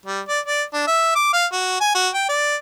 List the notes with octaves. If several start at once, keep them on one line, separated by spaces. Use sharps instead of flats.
G3
D5
D5
D4
E5
D6
F5
F#4
G#5
F#4
G5
D5